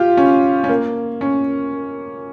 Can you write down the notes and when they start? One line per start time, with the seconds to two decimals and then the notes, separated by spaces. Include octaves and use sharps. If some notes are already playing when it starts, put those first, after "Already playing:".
Already playing: F4 G4
0.17 C#4
0.64 C#4
0.69 A#3
1.21 C#4